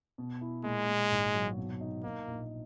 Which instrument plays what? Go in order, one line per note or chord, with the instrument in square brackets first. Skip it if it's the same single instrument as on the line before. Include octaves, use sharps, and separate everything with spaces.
[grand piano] B2
E4
[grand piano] A#2 [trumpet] G#3
[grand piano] A#2
G#1
F#3
B2
D#4
[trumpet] A#3 [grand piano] D#4
[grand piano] A#1